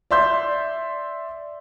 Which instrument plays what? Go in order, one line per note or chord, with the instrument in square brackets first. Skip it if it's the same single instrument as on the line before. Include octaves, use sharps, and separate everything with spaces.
[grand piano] D5 E5 C6 G6